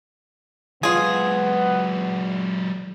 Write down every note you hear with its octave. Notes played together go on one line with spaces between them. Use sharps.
F#3 G#3 B3 F4 G#4